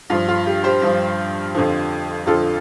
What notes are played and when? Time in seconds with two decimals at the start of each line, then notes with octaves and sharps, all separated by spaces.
0.10 G2 F3 F4
0.28 F4
0.47 G4
0.64 G4 C5
0.82 G2 F3
1.54 F2 D3 F3
2.26 F2 D3 F3 F4 A4